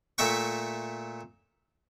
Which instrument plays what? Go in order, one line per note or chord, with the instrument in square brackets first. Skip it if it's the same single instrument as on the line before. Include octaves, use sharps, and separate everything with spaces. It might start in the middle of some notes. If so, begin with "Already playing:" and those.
[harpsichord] A#2 A3 E5 G5 C#6